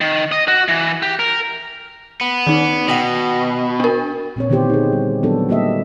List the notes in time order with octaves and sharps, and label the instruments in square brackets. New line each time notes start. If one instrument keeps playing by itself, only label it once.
[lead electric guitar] D#3
D#5
F#4
E3
G4
A#4
[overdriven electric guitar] B3
[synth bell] D#3 D#4
[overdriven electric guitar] B2 [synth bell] F#5 G5 A#6
[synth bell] D4 A#4
[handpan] A#2 C4 C#5
D3 D#3 B3 E4 G4 C5
D#4 G#4
G3
D#3 F#3 B3 D4 F#4 A4
G3 A#3 F#4 G4 D#5 E5